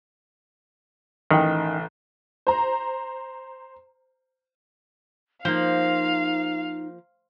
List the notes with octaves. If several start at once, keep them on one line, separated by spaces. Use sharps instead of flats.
A1 D#3 G5
C5 A#5
F3 A#3 D#4 C5 F5